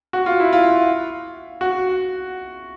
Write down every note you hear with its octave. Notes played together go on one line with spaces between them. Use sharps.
F#4
F4
E4
F4
F#4